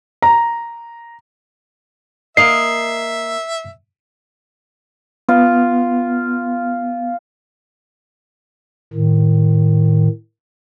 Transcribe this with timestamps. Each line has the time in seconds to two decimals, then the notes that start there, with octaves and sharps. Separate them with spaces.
0.22 A#5
2.37 A#3 D#5 E5 C7
5.29 B3 F4
8.93 A2 D#3